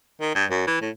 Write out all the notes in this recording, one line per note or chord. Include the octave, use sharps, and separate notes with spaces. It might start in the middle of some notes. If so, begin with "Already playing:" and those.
D#3
G2
F#2
E3
A2